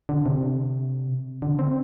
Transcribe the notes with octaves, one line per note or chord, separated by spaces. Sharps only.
D3
C3
D3
C4